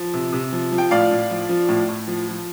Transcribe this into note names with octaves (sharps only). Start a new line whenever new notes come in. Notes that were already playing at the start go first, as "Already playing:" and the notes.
Already playing: F3
C3
C3
F3
F3
G5
A2 D5 F5
A2
F3
F3
A2
A2
F3
F3